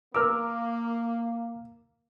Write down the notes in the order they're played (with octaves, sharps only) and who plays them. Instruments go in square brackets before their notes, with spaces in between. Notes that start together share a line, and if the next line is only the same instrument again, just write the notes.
[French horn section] A#3 [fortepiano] A#4 E6 [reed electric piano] D6 F6